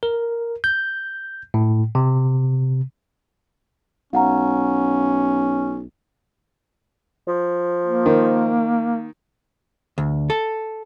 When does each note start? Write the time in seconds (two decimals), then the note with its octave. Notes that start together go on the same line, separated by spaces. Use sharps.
0.03 A#4
0.64 G6
1.54 A2
1.95 C3
4.13 B1 C#4 F5 F#5 A#5
7.28 F3
7.86 A#3
8.06 D#3
9.98 D2
10.30 A4